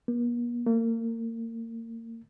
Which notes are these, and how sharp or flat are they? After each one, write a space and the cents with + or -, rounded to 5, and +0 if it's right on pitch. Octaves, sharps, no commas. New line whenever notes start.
A#3 +45
A#3 -35